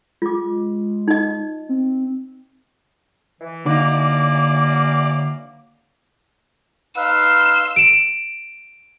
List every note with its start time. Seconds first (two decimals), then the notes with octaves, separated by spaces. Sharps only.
0.22 G#3 F4 D6
1.08 D#4 D#5
1.69 C4
3.41 E3
3.66 D3 E3 F#3 A#3 D#4 D5
6.96 D#4 B4 F5 C6 E6
7.76 D7 E7